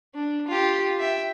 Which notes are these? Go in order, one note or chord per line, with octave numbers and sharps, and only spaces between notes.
D4
F4 G4
E5 G5